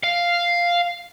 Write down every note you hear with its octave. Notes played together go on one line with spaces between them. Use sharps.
F5